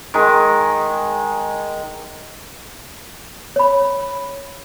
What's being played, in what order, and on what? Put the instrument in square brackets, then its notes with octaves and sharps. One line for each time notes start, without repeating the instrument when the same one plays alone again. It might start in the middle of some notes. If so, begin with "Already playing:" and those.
[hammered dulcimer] D#3 G#3
[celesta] C#5 B5